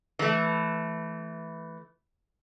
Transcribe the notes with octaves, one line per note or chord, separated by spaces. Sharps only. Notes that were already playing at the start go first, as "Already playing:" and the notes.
E3 A3